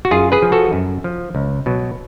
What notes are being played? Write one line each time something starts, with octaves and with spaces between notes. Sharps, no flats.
F#4
F#2 F4 G#4
G#4 B4
F3
F#4 A4
F#2
F3
C#2
B2 F#3